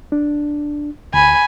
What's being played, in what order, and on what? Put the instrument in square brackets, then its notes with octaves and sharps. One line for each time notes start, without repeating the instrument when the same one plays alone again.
[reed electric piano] D4
[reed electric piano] D2 [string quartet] G#5 B5